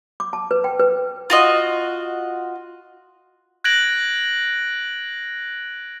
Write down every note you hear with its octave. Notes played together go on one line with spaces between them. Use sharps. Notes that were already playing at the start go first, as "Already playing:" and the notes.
D6
A5
B4
G5
B4
F4 F#4 D#5
F#6 G#6 A#6 D7 F#7